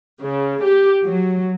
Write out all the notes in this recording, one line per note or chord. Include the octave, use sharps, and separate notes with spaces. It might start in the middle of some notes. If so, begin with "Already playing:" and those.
C#3
G4
F#3